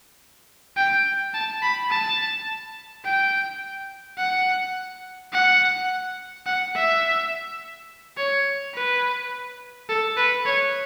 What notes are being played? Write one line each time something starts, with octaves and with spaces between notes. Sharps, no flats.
G5
A5
B5
A5
G5
F#5
F#5
F#5
E5
C#5
B4
A4
B4
C#5